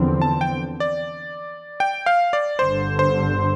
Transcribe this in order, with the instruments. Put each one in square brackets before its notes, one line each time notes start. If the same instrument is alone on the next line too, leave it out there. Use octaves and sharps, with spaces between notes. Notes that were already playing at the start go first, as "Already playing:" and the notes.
Already playing: [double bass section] E2 D3 F3 C4
[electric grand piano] A5
G5
D5
G5
F5
D5
[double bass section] G1 G2 D3 [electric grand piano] C5
[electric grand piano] C5